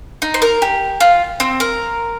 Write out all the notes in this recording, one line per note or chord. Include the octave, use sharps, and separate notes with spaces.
D#4
C5
A#4
G4
F4
C4
A#4